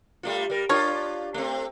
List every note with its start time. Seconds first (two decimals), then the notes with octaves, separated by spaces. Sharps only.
0.23 G3 A3 F4
0.50 G3 A#4
0.69 D4 F4 G4 A#4 C#5
1.34 A3 C4